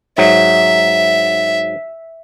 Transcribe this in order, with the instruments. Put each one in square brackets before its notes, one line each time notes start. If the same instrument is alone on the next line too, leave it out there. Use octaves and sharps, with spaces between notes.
[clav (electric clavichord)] G#2 F#3 [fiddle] E5